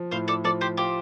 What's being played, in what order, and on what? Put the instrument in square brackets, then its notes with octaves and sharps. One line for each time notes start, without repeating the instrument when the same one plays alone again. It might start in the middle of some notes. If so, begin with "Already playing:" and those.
Already playing: [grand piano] F3
[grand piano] A2 [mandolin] C5 F5
[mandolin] A4 D5
[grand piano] F3 [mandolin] A4 D5
[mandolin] G4 C5
[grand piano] F4 [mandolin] G4 C5